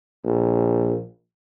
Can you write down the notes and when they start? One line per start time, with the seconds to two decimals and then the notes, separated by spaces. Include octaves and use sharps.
0.24 A#1